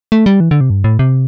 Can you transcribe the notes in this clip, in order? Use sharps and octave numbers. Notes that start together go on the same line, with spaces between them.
A3
G3
E3
D3
C3
G2
A2
C3